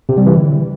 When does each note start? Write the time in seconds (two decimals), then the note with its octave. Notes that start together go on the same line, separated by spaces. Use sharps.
0.09 C3
0.18 G3
0.26 E3
0.35 D3